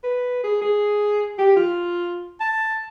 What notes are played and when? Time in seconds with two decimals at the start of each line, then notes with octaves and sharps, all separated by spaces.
0.03 B4
0.43 G#4
0.61 G#4
1.38 G4
1.56 F4
2.40 A5